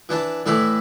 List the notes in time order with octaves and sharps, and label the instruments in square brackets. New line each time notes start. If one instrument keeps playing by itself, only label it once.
[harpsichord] E3 D4 A5
A2 E3 E4 D5